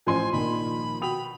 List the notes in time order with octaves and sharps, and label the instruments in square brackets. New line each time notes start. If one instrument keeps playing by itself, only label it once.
[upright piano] A1 C#4 C5 [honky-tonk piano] F3 C6 [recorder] G#5
[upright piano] A#1 D#3 [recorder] B5
[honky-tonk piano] B2 [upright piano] G5 D#6 F7 [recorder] B5